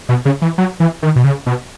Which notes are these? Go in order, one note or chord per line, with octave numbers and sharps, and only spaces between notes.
B2
C#3
E3
F#3
E3
D#3
B2
C#3
B2